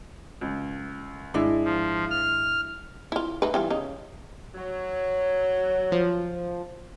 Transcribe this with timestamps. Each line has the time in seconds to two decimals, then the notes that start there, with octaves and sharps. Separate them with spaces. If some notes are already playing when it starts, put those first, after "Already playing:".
0.41 C#2
1.34 G#1 G#3 D4 E4
1.64 F3
2.11 F6
3.12 E4 F4
3.42 A3 D#4 B4
3.54 E3 G3 F4
3.70 C#3 D#4
4.55 F#3
5.92 F3